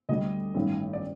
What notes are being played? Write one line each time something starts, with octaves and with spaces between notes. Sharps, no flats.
D2 D3 G3 D4 D#5
A1 G2 D#3
D5